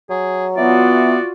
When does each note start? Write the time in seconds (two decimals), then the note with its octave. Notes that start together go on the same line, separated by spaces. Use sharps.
0.10 F#3 G#4
0.57 E3 B3 F4 F#4 D5